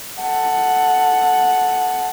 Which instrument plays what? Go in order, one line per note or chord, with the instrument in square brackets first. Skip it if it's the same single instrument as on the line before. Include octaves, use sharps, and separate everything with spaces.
[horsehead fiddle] A4 F#5